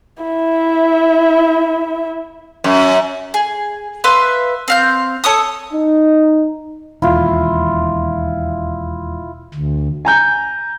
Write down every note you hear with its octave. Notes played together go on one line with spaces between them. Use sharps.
E4 E5
F#2
G#4
B4 E5 F5 C6
C4 F5 G6
A4 C#5 D#6
D#4
E1 D#2 E4 F4
D2
G#5 A#5 G6